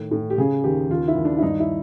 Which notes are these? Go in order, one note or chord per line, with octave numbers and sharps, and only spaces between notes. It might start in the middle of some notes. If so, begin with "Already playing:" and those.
Already playing: A2 D#3
A2
G4
C#3 G#4
D#2 G4
D#2 F4
E4
D#2
D4
E4
G2 D#4
E4